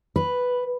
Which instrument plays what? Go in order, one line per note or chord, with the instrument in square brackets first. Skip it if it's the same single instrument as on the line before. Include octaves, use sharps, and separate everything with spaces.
[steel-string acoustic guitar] B4